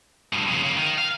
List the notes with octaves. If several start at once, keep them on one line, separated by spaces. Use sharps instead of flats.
G2 B2
F2 C#3
C#3 A#3
D#3
F5